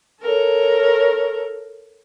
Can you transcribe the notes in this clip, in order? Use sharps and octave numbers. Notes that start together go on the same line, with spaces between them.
A4 A#4 C#5